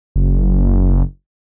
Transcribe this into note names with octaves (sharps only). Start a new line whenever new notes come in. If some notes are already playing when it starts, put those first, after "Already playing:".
F#1